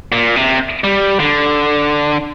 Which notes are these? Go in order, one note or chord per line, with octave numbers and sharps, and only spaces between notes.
A#2
C3
G3
D3